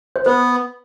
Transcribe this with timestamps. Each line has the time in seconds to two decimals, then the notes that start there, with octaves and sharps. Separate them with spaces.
0.16 C5
0.26 B3 B4